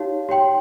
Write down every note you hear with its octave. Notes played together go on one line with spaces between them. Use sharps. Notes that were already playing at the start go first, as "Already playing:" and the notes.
Already playing: D#4 G4 C#5 F5
G4 C#5 G5 C6